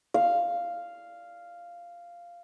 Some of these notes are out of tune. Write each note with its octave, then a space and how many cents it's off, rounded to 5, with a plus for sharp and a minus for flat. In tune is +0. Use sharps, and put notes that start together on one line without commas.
F5 -5